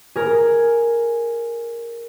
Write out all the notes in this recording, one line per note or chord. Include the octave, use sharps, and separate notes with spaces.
G#4 A#4